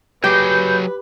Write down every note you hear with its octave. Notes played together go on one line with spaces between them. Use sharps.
F#3 G4 G#4 B4 G6